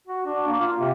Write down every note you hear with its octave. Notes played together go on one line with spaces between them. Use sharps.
F#4
D4
A#3
F4
C3